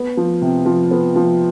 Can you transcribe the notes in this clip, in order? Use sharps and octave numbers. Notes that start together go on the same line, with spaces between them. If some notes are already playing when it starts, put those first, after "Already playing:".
Already playing: B3
F3
C3
F3
B3
F3